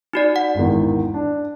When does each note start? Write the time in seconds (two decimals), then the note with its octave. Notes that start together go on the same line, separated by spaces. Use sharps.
0.13 D#4 F#4 D5
0.36 F#5
0.55 G#1 E2 D#3
1.14 D4